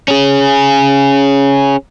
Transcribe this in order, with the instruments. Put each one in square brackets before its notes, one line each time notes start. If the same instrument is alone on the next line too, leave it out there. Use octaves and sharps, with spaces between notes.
[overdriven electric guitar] C#4 G#4